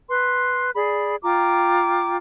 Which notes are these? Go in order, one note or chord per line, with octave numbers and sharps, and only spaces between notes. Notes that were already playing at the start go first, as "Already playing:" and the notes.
B4 C6
G#4 D5 B5
F4 G5 A#5 D6